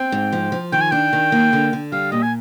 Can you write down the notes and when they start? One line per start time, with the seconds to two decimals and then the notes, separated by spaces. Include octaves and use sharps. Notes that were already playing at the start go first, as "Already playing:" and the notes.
Already playing: C4 G5
0.12 G#2
0.32 F3
0.52 F3
0.72 D#3 G5
0.81 G#5
0.91 D4 G5
1.13 D#3
1.32 A#3
1.53 D3
1.73 D3
1.92 G3 F5
2.12 A#2 D#5
2.23 G#5